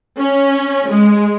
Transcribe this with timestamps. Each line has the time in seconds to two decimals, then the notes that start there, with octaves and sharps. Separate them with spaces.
0.18 C#4
0.89 G#3